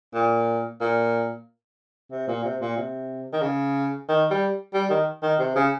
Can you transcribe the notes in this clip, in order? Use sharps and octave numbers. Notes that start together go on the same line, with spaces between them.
A#2
A#2
C3
A#2
C3
A#2
C3
D#3
C#3
D#3
G3
G3
D#3
D#3
C3
C#3